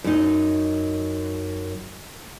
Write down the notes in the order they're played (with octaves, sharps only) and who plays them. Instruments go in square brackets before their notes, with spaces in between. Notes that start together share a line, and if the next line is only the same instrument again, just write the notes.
[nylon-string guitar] F#2 D#4